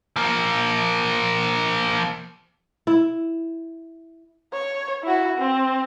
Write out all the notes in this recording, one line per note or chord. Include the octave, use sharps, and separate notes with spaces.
F3 A#3
E4
C#5
E4 F#4
C4